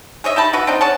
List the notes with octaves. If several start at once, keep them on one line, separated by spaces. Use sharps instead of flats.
G#4 C#5 D#5 E5
D#4 G4 A5 B5
E3 F#4 B4 E5
C4 D4 D#4
G#4 C#5 F#5 A5